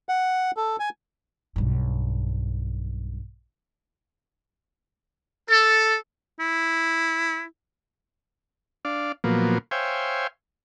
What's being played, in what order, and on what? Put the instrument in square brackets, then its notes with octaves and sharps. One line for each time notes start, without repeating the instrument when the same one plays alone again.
[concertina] F#5
A4
G#5
[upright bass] B1 G2
[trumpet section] A4
[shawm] E4
[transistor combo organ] D4 D5 F5
A#2 F3 F#3 A#3 B3
C5 C#5 E5 F5 G5 G#5